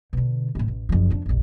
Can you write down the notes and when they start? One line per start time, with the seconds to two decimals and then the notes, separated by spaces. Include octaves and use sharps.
0.13 B2 D3
0.55 D#2 A2
0.68 A1
0.89 F#1 F3
1.10 F2 D4
1.26 F1 A#1